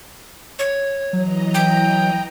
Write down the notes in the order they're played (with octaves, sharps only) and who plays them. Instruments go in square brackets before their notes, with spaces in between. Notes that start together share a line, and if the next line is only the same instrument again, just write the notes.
[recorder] C#5
[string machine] E3 D#5 A#5 [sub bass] F#3
[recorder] G5